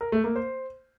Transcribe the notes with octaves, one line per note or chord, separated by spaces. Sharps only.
A#4
A3
A#3
C5